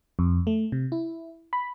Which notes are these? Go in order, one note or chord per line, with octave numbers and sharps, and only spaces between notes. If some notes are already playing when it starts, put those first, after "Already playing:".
F2
A3
C3
E4
B5